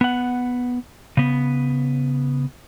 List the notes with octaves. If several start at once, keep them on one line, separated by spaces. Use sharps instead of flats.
B3 F#5
C#3 B3